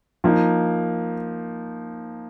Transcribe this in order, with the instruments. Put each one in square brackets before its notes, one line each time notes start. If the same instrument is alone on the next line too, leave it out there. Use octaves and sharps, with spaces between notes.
[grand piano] F3 A#3 D#4